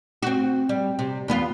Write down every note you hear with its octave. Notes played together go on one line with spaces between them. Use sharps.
C4 F#4
G3
C3
E2 B3 F4